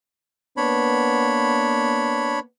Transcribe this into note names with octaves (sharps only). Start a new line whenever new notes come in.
A#3 B3 D4 C#5 B5